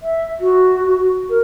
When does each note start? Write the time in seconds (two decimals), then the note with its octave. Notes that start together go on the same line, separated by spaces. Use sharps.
0.01 E5
0.40 F#4
1.30 A#4